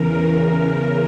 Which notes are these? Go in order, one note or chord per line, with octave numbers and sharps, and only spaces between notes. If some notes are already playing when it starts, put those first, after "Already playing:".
Already playing: E2 C#3 E3 A#4
A#4